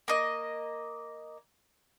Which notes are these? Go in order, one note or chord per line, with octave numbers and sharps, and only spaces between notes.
A#3 D#5